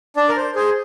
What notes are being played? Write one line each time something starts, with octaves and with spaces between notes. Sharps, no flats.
D4 D5
A#4
C5
G#4 C5